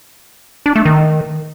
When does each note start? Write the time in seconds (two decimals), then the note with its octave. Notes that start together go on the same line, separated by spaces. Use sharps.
0.66 D4
0.76 A3
0.85 D#3